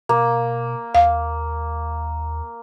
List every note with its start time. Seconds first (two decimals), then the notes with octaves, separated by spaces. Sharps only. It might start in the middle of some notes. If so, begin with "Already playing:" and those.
0.09 B2 A#3
0.95 D#2 F5